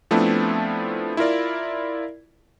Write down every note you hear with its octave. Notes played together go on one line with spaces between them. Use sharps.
F3 A3 B3 C4 D4 E4
E4 F4 A#4 D5